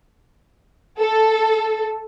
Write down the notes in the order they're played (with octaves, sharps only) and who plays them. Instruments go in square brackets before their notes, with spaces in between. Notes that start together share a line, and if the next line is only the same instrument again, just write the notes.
[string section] A4